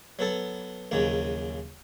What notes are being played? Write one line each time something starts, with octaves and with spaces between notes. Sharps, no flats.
F#3 B3 A4
A#1 D#2 C#3 F#3